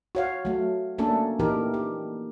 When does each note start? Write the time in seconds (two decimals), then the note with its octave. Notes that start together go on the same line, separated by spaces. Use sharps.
0.15 F#4 C#5 F5
0.45 F#3 A3
0.98 A3 A#3 C#4 D4 A4
1.39 A#2 E3 D#4 G4 A#4
1.74 G4